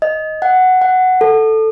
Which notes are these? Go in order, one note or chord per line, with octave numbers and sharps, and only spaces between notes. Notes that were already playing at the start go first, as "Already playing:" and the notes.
D#5
F#5
F#5
A4